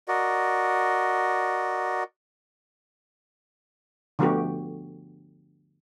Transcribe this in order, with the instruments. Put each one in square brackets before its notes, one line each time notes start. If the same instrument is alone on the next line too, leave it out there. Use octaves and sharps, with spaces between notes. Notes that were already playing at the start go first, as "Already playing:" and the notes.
[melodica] F#4 A#4 D5 D#5
[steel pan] D3 F3 A3 B3 F#4 G4